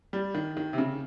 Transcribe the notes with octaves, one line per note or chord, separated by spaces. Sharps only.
G3
D#3
D#3
C3
C#3